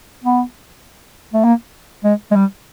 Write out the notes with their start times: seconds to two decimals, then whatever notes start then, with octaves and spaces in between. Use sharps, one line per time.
0.24 B3
1.33 A3
1.44 A#3
2.04 G#3
2.31 G#3
2.36 G3